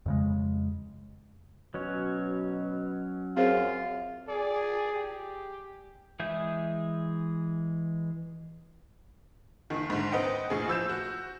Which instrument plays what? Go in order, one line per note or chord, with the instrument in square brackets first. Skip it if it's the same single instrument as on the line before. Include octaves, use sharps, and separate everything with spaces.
[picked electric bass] F2 C#3 G#3
[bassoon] B2 [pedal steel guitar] F#3 C#4 C#5
[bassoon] F#2 [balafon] C4 G#4 C5 [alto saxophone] F4
[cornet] G#4 [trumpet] D5
[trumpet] G4
[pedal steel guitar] E3 G#3 G#4 E5 G6
[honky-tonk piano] F#1 D#3
G#2 D3
C4 B4 D#5 F#5 G5
A#1 A2 G#4
F3 E6 G6 E7
F#4